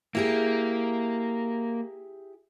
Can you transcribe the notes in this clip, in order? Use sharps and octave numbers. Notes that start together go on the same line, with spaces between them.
A#3 E4 G4 G#4